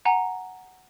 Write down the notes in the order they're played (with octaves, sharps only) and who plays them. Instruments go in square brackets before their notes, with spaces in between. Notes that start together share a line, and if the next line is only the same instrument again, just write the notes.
[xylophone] F#5 G#5 A#5